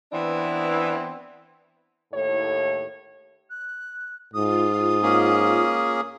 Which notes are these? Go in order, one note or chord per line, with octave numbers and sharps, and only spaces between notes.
E3 B3 C4 D4 E4
D#2 A2 C#5
F#6
G#2 F4 D#6
A#3 C#4 G#4